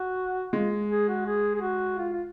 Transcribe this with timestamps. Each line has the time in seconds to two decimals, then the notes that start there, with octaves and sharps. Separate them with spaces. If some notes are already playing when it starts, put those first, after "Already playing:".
Already playing: F#4
0.53 G#3 F4
0.89 G#4
1.08 F#4
1.26 G#4
1.55 G#4
1.61 F#4
1.98 F4
2.13 F4